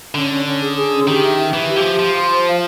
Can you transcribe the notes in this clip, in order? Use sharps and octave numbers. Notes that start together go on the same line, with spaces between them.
D3 C#4
C#4
C#4
G#4
G#4
C#4
D#3 G4
E5
E5
E3 E5
G4
F3
G4
F3 F5
C6
C5
F5